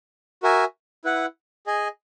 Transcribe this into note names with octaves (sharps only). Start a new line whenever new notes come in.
F#4 A#4 E5 G#5
E4 B4 F#5
G#4 D#5 G#5